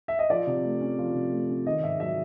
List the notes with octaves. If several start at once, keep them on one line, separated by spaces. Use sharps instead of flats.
E5
D#5
F3 D5
C3
A3
C#4
F3
C3
A3
C#4
D#3 D#5
G#2 E5
F#3 E5